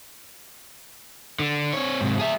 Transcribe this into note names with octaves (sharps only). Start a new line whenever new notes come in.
D3
C4 C#5
G#2 C3
G#4 E5